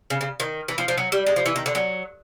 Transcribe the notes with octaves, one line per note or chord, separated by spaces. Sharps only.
C#3
C#3
D#3
E3
F3
F3
F#3
G3
G#3
F3
E3
D#3
D3
F#3